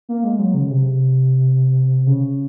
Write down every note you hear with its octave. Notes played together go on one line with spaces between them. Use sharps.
A#3
G#3
F#3
C#3
C3
C#3